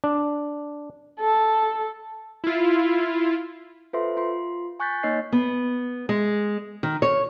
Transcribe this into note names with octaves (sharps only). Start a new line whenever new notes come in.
D4
A4
E4 F4
F4 A4 B4 C5 E5 C6
F4 C6
G#5 C#6 F#6 G6 A6 B6
A#3 D#4 C#5 D#5 C7
B3
G#3
D#3
C#5